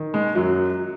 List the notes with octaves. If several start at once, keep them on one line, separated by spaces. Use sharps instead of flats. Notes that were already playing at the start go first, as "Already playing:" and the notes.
Already playing: D#3
G#3
F#2 F#3